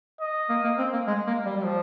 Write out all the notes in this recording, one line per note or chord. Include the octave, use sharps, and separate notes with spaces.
D#5
A#3
A#3
C4
A#3
G#3
A#3
G3
G3
F3